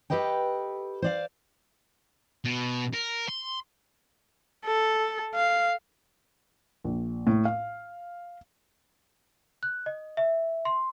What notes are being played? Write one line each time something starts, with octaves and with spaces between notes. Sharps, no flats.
G4 A4 B4 D#5 G5
C5 D5 F5
B2
A#4
C6
A4
F5
A#1
A2
F5
F#6
D#5
E5
C6